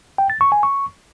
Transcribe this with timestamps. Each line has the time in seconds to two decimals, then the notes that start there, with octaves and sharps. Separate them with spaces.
0.18 G5
0.30 A6
0.41 C#6
0.52 G#5
0.63 C#6